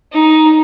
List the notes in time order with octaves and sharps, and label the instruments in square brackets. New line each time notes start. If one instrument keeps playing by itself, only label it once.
[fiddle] D#4